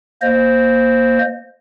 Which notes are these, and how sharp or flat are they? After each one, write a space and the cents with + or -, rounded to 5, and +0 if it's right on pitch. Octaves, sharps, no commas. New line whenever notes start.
A#3 +5 C5 +0 D#5 -25